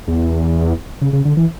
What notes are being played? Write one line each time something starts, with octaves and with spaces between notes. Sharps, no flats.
E2
C#3
C#3
D3
E3